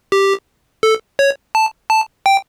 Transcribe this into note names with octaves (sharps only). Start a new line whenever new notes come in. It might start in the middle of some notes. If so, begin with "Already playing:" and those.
G4
A4
C#5
A5
A5
G5